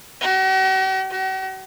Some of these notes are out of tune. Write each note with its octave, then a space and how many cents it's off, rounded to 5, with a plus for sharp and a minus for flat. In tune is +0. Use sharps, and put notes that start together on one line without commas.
F#4 +45
F#4 +45